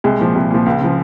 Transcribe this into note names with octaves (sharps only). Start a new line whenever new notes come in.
C2 G#3
A#2 F3
C2
A#2 F3
C#2
C#3 F3